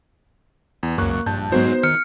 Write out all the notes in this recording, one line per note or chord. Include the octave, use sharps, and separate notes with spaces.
E2
C#2 F#2 A#3 C#6 F#6
A#1 G2 A5 G6
G#2 F#3 G#3 B3 D#4 F#4 C5
D#3 F6 C#7